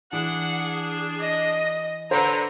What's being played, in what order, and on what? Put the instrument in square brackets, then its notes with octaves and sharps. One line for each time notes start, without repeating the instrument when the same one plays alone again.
[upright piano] E3 [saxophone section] D4 G#4 [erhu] F#5
[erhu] D#5
[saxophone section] D3 [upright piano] B4 C5 [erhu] A#5